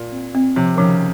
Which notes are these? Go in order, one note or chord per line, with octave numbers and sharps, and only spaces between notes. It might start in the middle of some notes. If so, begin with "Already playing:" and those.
Already playing: A#2
C4
C4
C3 F3
D#3
C#3 F3